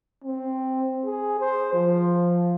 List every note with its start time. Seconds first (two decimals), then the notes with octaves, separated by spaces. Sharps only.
0.24 C4
1.05 G#4
1.39 C5
1.73 F3